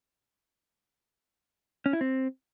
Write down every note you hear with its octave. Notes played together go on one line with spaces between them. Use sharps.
C#4
E4
C4